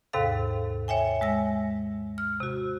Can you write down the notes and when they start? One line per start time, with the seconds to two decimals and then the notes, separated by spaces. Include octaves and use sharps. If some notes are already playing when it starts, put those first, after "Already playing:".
0.13 D#2 G#2 C3 A4 F5
0.88 C#5 E5 G5 G#5
1.21 G#3 E6 A#6
2.18 F6
2.40 C3 F#4